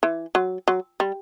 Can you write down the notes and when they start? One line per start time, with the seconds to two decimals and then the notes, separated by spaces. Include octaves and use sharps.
0.03 E3
0.35 F#3
0.68 F#3
1.00 G3